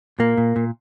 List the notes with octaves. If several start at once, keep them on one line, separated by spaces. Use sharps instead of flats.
A#2 A#3
A#2
A#2